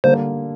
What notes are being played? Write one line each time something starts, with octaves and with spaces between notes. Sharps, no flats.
D3 G3 A#3 C5